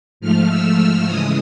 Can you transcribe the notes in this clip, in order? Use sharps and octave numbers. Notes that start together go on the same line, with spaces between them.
G#2 F3 A3 F6
E6
F6
C#3 E3 G#3 D#6